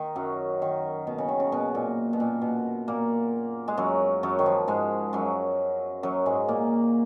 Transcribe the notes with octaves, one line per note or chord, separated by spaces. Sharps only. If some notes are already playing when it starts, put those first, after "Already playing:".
Already playing: D#3
F#2 F#3
D#3
B2
C#3
D#3
C#3
B2
A#2
B2
A#2
B2
A#2 A#3
G#3
F#2 F#3
F#2 F#3
D#3
F3
G#2 G#3
F#2 F#3
F#2 F#3
G#2 G#3
A#2 A#3